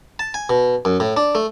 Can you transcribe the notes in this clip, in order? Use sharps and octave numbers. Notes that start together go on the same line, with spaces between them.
A5
G#5
B2
F#2
A2
D4
A3